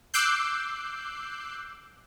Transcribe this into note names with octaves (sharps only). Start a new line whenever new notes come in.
D6 E6 F#6 G6 C7